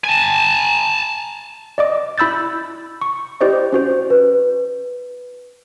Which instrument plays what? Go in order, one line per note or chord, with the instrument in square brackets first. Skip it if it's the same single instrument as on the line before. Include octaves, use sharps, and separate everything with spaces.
[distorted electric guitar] G#5 A5
[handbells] D5 D#5 D6
E4 B5 E6 G6 A6
C#6
E4 G4 C5 D5 D#5
C#4 F#4 C5
[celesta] B4